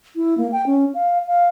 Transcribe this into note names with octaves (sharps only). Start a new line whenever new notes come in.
E4
A#3
G5
C#4
F5
F5